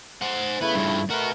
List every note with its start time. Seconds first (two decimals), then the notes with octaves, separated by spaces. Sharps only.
0.21 C5 F#5
0.61 C#3 A3 B3 E4 B4
0.75 G2 F3
1.10 A3 F#4 A#4 B4